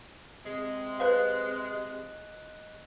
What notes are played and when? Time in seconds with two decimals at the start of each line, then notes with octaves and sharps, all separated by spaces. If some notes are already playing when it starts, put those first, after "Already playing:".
0.45 C3 G#3
1.00 B4 C5 D#5 F5 F#6